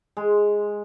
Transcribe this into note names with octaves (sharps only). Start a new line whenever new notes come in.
G#3